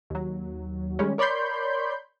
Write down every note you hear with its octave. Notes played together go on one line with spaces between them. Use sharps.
D#2 F#3
D#3 G3 G#3 C#4
A#4 C#5 D5 B5 C6 G6